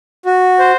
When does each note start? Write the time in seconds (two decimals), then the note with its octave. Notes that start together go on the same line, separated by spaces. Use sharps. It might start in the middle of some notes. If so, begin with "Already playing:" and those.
0.25 F#4
0.59 C5